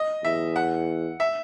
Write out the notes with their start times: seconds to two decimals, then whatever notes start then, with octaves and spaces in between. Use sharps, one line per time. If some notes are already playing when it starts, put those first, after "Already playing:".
Already playing: D#5
0.24 E2 E5
0.56 F#5
1.20 E5